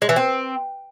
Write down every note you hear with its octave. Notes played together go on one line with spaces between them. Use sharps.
G#3
E3
C4